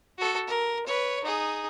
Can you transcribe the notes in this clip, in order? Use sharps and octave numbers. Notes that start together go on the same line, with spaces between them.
F#4 A4
A#4
B4 C#5
D#4 G#4